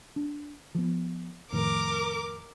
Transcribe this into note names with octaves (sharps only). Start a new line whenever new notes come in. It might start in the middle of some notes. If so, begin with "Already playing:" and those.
D4
F3 B3
F2 A2 D#3 A#4 D6